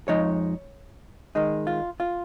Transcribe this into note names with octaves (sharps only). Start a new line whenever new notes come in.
F2 F3 G#3 D#4 C#5
D#3 G#3 D#4
F4
F4